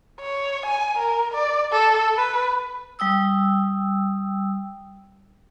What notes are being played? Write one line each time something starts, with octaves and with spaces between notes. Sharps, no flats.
C#5
G#5
A#4
D5
A4
B4
G3 G5 D#6 E6